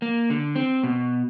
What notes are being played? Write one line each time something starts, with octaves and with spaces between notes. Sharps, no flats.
A#3
D3
C4
B2